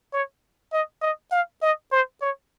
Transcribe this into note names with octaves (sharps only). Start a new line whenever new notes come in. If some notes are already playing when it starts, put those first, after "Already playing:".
C#5
D#5
D#5
F5
D#5
C5
C#5